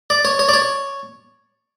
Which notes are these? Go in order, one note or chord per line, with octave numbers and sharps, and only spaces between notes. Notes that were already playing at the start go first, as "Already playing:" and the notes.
D5
C#5
C#5
D5
C#5